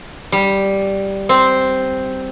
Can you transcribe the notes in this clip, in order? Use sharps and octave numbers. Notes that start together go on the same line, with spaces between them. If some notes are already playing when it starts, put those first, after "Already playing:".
G3
C4